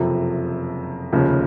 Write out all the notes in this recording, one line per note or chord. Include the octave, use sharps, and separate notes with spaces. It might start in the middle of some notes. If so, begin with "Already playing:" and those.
Already playing: F#1 F2 C3 F3
F1 D#2 C#3 F3